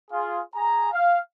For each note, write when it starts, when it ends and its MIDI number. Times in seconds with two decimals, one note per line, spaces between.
0.11 0.40 65
0.11 0.40 68
0.54 0.91 68
0.54 0.91 80
0.54 0.91 82
0.92 1.19 77